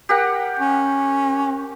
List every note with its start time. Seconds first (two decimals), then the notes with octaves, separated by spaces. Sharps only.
0.09 G4 A#4 F#5
0.59 C#4